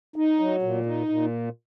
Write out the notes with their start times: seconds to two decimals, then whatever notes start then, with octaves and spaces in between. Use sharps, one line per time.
0.16 D#4
0.40 F#3
0.62 A#2
0.86 D#4
1.09 A#2